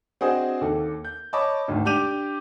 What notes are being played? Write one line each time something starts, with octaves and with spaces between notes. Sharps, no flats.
C4 D4 F#4 G#4 C5 D#5
D#2 A4
G6
C#5 D#5 A5 B5 D6
G#1 D2
D4 G4 D6 G6 D#7 F7